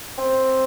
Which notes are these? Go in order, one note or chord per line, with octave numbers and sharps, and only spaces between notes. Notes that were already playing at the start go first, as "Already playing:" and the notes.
C4